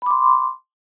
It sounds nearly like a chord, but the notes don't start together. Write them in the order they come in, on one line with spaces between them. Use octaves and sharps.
B5 D6 C6